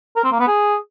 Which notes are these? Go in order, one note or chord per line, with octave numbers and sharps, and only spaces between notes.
A#4
C4
A#3
B3
G#4